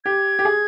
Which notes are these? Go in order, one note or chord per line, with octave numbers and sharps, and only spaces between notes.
G4 G#6
G4
G#4